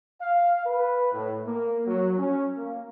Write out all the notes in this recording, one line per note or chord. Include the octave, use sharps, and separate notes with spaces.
F5
B4
A2
A#3
F#3
C#4
A#3